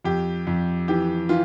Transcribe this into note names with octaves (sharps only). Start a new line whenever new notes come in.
F2 G4
F2
E3 G4
E3 F4